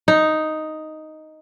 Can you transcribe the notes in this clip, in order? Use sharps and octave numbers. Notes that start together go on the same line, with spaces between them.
D#4